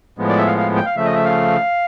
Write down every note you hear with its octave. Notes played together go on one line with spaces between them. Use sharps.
A2 F3 G#3 B3
D5
E5
F5
F5
G5
F5
C#3 F3 A3 E5
D#5
E5
F5